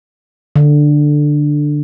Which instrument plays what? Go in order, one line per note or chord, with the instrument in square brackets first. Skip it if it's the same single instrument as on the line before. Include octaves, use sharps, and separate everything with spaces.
[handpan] D3